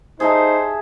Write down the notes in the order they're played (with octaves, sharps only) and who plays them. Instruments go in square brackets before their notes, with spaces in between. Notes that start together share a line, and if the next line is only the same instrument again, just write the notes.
[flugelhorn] D#4 [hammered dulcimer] G#4 E5 A5 [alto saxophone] C5